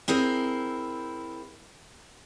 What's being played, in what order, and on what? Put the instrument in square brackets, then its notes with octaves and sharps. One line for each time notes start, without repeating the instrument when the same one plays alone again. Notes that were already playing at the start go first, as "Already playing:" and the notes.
[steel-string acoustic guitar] C4 E4 G#4 A#4 C5